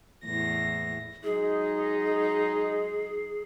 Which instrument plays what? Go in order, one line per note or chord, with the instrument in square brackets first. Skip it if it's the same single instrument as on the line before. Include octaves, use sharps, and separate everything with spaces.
[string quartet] E2 A2 A#6
[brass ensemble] F#3 G#3 D#4 [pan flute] G#4